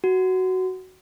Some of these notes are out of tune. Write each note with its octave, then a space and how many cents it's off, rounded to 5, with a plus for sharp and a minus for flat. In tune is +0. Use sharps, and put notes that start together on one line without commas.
F#4 +10